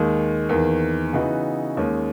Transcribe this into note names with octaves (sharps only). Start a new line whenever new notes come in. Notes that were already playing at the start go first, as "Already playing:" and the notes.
Already playing: D#2 D#3 G#3
E2 D#3 A#3
C#3 E3 B3 D#4 F#4
D#2 D#3 G#3 C#4